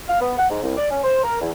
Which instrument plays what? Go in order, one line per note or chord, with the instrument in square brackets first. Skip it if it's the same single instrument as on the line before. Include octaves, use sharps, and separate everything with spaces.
[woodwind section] F5
B3
F#5
G#2
C2
D5
C#4
C5
A#4
E2